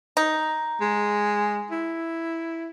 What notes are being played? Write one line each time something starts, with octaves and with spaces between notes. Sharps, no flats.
D#4
G#3
E4